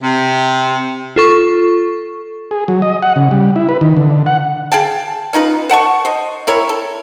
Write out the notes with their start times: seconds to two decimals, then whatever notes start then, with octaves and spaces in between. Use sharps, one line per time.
0.02 C3
1.16 F4 A4 C#6
2.51 G#4
2.68 F#3
2.82 D#5
3.02 F#5
3.16 C#3
3.31 G3
3.56 E4
3.69 B4
3.81 D#3
3.97 D3
4.26 F#5
4.72 G#4 F5 G5 A5
5.33 C#4 D#4 F4 B4
5.69 C5 F#5 A5 C#6
6.05 C5 D#5
6.47 C4 E4 A#4 C#5
6.69 A4